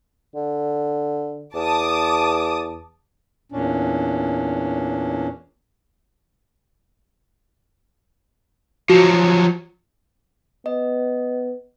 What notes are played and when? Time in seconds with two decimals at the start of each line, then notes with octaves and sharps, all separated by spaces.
0.35 D3
1.55 E2 A5 D6 D#6
3.52 E2 A#2 C#4 D4
8.90 F3 F#3 F#4
10.66 B3 D#5